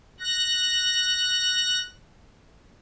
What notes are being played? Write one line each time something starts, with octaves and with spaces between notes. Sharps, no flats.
F#6 A#6